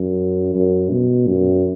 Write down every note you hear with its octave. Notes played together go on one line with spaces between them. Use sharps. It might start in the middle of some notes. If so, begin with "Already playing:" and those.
Already playing: F#2
F#2
B2
F#2